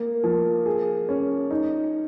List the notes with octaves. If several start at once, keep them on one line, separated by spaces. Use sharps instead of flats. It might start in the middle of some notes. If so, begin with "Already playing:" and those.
Already playing: A#3
F3
G#4
C#4
D#4